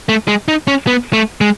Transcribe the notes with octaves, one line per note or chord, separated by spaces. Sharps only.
A3
G#3
D#4
C#4
B3
A3
G#3